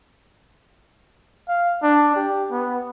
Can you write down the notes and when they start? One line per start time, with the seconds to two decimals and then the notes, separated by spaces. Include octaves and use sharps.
1.48 F5
1.82 D4
2.15 G4
2.51 B3